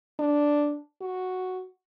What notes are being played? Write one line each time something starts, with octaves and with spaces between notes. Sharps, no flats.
D4
F#4